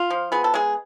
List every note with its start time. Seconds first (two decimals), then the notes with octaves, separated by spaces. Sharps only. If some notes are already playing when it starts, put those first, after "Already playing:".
Already playing: F4
0.10 F3
0.32 B3 G#4
0.44 A4
0.54 G#3 G#4